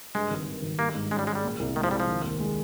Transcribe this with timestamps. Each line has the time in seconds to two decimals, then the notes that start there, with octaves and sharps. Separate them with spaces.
0.15 G2 G#3
0.31 G#1
0.46 D#3
0.62 G#1
0.79 G3 A#3
0.95 G#2
1.11 G#3 C#4
1.19 G3
1.27 G#3 G#4
1.35 G3
1.43 A#2
1.59 C2
1.76 D#3 G#3
1.84 F3
1.91 C2 G3
2.00 F3
2.08 D#3
2.24 D#2
2.40 G#3